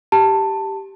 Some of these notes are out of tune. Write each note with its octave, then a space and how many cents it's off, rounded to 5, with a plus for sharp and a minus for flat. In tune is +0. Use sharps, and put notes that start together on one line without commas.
G4 +0 A5 +15